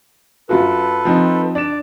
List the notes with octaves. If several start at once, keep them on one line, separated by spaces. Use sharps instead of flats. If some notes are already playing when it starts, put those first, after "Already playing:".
F#2 F4 F#4 A4 B4
F3 C4 D#4
D4 D5 E7